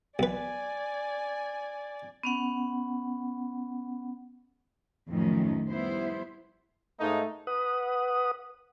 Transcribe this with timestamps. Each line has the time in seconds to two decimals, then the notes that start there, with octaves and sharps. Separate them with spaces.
0.19 B1 B4 D5 G#5
2.23 B3 C#4 F#5
5.09 F2 A2 D#3 F#3 C#4 D#4
5.70 G3 B3 E4 C5
7.00 G#2 A3 A#3 D#4
7.47 B4 F#5 D#6